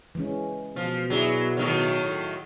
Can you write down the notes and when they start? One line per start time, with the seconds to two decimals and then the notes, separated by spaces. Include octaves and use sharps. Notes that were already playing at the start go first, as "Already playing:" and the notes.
0.15 E3 G#3 C#4
0.76 B2 F3
1.10 F#3 E4 G#4 D5
1.57 A2 D#3 F#3